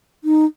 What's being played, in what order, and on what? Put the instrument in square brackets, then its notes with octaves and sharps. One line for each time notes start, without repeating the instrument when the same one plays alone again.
[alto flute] D#4